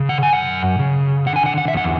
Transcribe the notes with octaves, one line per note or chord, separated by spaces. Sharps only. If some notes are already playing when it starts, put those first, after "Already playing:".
Already playing: C#3
F#5
G#5
F#2 F#5
C#3
D3 F#5
G#5
F#5
F#5
E5
E2 F#5